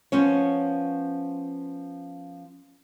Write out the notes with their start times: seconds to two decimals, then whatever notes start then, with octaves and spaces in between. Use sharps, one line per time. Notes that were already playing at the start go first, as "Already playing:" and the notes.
0.12 F3 B3 C#4 C#5